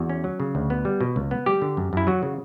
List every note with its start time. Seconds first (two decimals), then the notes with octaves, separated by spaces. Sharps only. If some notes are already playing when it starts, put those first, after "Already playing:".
Already playing: E2 F#4
0.10 C#4
0.24 F#3
0.40 C#3
0.55 D2
0.70 B3
0.85 G3
1.01 B2
1.16 C#2
1.31 B3
1.46 G3 G4
1.62 D3
1.77 F#2
1.93 F#2 E4
2.07 F#3 F#4
2.23 C#3